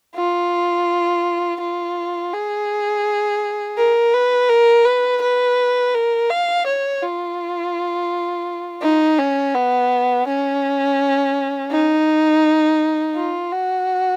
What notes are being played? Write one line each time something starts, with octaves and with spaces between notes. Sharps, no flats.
F4
F4
G#4
A#4
B4
A#4
B4
B4
A#4
F5
C#5
F4
D#4
C#4
B3
C#4
D#4
F4
F#4